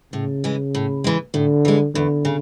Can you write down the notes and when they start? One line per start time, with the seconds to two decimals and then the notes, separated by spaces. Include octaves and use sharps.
0.13 A2 C#3
0.44 E3 G#3
0.75 A2
1.04 E3 G#3
1.34 A2 D3
1.65 E3 G#3
1.95 E2 D3
2.25 C#3